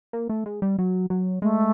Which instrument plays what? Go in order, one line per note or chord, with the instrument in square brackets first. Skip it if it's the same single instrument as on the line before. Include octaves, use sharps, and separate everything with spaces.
[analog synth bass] A#3
A3
G#3
G3
F#3
F#3
[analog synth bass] G#3 [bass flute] A3